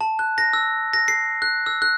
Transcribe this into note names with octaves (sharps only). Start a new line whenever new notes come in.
A5
F#6
A#6
E6
A#6
C7
F#6
E6
F#6